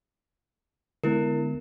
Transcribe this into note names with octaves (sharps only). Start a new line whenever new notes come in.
D3 G#3 B3 E4 A#4